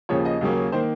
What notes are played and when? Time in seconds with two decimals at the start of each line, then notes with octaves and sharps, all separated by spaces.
0.09 D#2 C#3 F3 C#5
0.25 D#5
0.41 D#2 C#3 F#3 A#3 C#4
0.72 D#3 A#3 C5